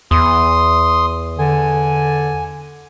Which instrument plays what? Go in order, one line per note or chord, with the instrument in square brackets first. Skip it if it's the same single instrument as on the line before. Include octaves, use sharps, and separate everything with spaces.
[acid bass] E2 [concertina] C6 D#6
[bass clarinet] D3 [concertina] G#5